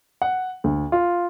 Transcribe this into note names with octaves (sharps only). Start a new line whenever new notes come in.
F#5
D2
F4